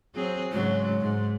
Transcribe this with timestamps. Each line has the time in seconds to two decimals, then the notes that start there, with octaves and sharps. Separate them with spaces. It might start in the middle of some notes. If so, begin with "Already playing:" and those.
0.15 F#3 C4 G#4
0.52 G#2 C#3 F#3 G#3
1.01 G#2